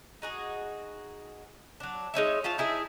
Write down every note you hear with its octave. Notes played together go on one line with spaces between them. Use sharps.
D#4 F#4 G#4
F#3 D4
G#3 D#4 C#5 E5
C#4 F4 F5 A5
D#4 E4 G#4 E5